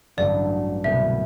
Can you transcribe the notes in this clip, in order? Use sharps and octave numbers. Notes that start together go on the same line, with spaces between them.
A1 G2 D3 F#3 A3 D5
C2 B2 G3 B3 E5